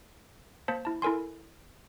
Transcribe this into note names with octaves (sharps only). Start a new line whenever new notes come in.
A#3 C5 A5 B6
E4 A5
E4 A4 A#4 G#5 C6